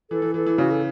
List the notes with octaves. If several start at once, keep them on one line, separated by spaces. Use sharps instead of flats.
E3 A4
E3
E3 A4
E3
C#3 F#4
A4